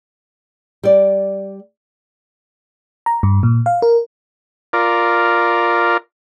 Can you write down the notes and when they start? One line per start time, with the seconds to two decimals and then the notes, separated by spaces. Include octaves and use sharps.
0.83 G3 D5
3.06 A#5
3.23 G2
3.43 A#2
3.66 F5
3.82 A#4
4.73 F4 A#4 D5